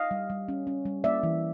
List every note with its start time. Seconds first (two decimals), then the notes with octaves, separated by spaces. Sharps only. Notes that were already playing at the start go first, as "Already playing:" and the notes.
Already playing: D#5 F5
0.11 G3
0.30 G3
0.48 C#4
0.67 C#4
0.85 G3
1.04 A#3 D5 E5
1.23 E3